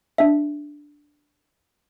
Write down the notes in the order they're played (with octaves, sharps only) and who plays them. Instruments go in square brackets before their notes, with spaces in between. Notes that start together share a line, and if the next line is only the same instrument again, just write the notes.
[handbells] D4 E5